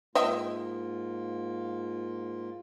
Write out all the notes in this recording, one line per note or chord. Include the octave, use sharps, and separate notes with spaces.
G#2 A#3 F4 D#5 E5 G5